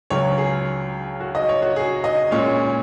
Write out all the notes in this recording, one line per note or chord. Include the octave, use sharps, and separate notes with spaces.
C#2 C#3 F#3 C#5
G#4
F#4
D#5
C#5
F#4
G#4
D#5
A#2 G#3 C#4 C#5